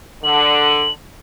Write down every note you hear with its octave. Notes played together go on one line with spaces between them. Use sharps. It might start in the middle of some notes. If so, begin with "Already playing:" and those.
D3 F#7